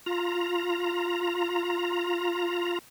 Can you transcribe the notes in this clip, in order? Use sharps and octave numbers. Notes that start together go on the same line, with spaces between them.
F4 A#5